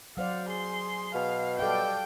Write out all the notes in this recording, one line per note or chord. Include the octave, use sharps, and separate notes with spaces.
F#3 C5 D5 F5 F#5
G#4 C6
B2 F5
G3 A4 D5 F5 G5